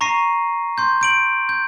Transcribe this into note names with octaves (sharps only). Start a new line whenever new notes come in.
A#5 C#6 A#6 C7 D#7
C6 G6
G6 D7 F#7
G6